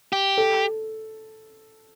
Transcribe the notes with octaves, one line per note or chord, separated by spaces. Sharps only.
G4
A4